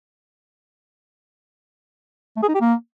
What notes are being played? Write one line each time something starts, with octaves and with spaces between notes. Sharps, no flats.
A3
G#4
D#4
G4
A#3